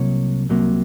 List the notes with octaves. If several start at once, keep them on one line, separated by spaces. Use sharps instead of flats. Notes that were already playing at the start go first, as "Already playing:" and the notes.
Already playing: C2 C3 F#3 A#3 C#5
C2 C3 F#3 A#3